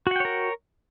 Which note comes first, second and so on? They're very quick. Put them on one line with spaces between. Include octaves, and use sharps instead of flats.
F#4 F#5 G5 C#5 A#4